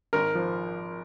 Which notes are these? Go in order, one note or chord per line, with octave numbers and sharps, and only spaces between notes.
G#1 A#4
F3